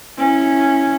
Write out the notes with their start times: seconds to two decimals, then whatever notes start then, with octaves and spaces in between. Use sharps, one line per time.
0.18 C#4 E4